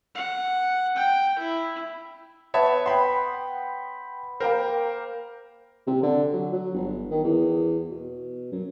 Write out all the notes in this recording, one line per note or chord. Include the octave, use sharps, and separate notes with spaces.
F#5
G5
E4
B3 C#5 E5 A5
F#5 G5 B5 C6
A#3 A#4 C5 G5 B5
C3
D3
F#3
F#3
G1
D#3
E2
B2
F#2